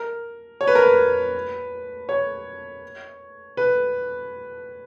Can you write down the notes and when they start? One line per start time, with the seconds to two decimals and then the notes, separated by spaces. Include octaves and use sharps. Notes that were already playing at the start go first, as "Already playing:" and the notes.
Already playing: A#4
0.61 C#5
0.67 B4
0.75 A#4
0.82 B4
2.09 C#5
3.57 B4